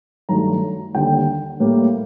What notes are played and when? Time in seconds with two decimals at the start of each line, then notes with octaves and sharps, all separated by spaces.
0.29 G2 D#3 F#3 A3 A#5
0.95 D#2 D3 G3 G5
1.60 A2 G3 A#3